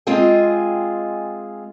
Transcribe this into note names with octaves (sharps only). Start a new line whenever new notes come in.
G#3 C4 F4 G#4 D#5 G5